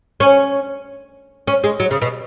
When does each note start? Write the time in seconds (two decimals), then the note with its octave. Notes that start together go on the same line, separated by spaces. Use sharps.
0.20 C#4
1.47 C#4
1.64 G#3
1.80 F#3
1.91 C#3
2.02 B2